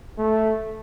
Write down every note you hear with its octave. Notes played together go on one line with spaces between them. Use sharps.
A3